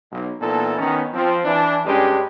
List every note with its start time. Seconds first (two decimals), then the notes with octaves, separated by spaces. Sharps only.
0.12 B1
0.41 A#2 E3 B3 D#4 A4
0.78 D#3 B3 C#4 D#4
1.13 F3 C4
1.45 E3 D4
1.85 G2 G#3 C#4 D4 G4 B4